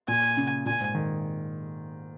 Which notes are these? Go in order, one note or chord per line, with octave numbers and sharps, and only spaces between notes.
A#2 G#5
C#3
A#2 G#5
G#2
D#3